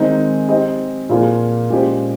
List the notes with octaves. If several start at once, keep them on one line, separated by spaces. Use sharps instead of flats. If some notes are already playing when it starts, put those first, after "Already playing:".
Already playing: D#3 G#3 C4 D#4
C4 G4 C5 D#5
A#2 F3 A#3 F4 G#4
A#2 G#3 C#4 G4 C5